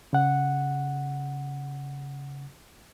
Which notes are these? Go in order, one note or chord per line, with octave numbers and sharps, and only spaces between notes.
C#3 F#5